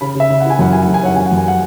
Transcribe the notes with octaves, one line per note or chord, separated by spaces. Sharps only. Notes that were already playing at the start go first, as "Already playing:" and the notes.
C#3 B5
C#3 E5
C#3
E4 F#5
G#5
F#2 F#5
E4 G#5
F#5
F#2
G#5
C#4 F#5
F#2 G#5
F#5
F#2
G#5
F#5